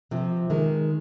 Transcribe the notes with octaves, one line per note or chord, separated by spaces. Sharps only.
C3 F3
D#3 G#3